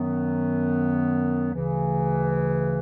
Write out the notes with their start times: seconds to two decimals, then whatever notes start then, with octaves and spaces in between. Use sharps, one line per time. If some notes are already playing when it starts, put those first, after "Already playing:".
Already playing: F#2 D#3 F#3 B3
1.53 D2 C#3 E3